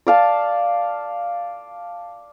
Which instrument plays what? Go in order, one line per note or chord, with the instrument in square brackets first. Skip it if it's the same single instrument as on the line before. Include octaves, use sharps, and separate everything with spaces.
[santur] D5 F5 A5